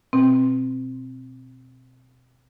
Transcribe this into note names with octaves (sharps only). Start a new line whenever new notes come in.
B2 C4